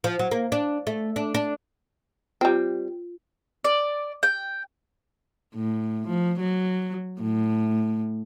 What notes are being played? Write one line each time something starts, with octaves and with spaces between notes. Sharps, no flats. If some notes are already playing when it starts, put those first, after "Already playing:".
F3
F#3
A#3
D4
A3
D4
D4
G3 C4 F4
D5
G5
A2
F3
F#3
A2